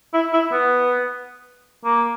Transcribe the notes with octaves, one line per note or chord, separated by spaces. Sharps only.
E4
E4
B3
A#3